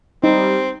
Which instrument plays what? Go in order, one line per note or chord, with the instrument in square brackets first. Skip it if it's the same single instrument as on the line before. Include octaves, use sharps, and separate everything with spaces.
[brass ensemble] G3 [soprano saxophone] C4 [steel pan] D#4